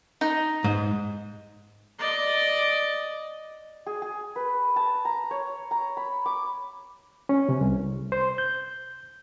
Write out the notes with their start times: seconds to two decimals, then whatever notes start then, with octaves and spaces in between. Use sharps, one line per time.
0.21 D#4
0.64 G#2
1.99 D5 D#5
3.86 G#4
4.02 G#4
4.36 B4
4.76 A5
5.05 A#5
5.31 C#5
5.71 A#5
5.97 B5
6.26 D6
7.29 C#4
7.49 C3
7.61 C2
8.12 C5
8.38 G6